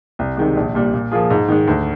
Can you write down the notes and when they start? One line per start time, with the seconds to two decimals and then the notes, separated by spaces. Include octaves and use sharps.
0.19 C2
0.37 C3 D#3 G#3
0.57 A#1
0.75 A#2 G3
0.94 A#2
1.12 F3 A#3 F4 G#4
1.30 G#2
1.49 D#3 G#3
1.68 D2